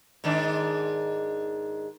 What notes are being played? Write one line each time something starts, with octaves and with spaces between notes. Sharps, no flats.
G#2 D#3 D4